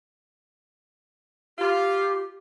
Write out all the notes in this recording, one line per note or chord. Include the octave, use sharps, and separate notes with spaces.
F4 G4